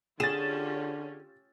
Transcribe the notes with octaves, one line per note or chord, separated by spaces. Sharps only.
D3 C#4 F4 G4 G#4 A6 E7